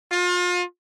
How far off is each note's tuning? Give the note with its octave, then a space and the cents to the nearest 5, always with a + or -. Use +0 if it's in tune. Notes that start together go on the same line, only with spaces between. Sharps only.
F4 +35